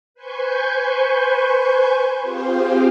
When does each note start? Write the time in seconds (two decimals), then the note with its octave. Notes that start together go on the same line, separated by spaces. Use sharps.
0.14 B4 C5 G#5 C#6 G6
2.21 C4 F4 G4 G#4 C5 F5